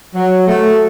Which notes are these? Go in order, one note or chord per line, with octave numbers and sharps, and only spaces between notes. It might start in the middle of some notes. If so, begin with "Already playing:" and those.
F#3
A3